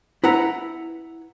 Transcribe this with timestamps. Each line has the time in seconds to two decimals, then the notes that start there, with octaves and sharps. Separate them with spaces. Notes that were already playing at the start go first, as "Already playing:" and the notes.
0.24 E4 B4 F#5 A#5